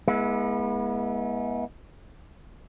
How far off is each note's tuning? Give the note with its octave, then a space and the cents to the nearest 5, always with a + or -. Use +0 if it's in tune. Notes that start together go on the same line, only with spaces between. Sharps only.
G#3 +10 B3 -35 E4 -15